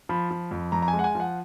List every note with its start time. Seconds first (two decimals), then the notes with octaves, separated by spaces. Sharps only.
0.09 F3 B5
0.31 F3
0.51 F2
0.72 F2 A#5
0.82 A#5
0.88 G#5
0.93 G#3
0.99 F#5
1.04 G#5
1.15 F3 F#5